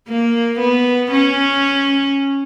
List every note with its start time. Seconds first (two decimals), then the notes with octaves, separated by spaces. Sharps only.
0.08 A#3
0.60 B3
1.12 C#4